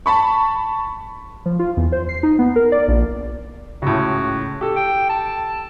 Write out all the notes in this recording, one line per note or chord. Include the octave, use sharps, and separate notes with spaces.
A5 B5 C#6
F3
F4
E2
C5
C7
D#4
B3
A#4
D5
A#1
C#2 A2 F#4
G4 A4
G5
A5